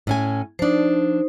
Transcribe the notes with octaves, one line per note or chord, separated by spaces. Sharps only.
A2 C#4 G#5
F3 D4 D#4 C5